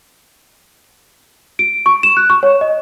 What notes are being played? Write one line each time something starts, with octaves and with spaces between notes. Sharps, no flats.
D7
C#6
E7
F#6
C#6
C#5
D#5